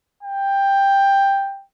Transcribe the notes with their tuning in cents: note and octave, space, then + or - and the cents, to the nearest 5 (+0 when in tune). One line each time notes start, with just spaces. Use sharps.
G5 +10